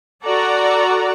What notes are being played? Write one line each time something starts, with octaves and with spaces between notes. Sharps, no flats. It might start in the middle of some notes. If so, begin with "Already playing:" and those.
F#4 A4 D5 F#5 A#5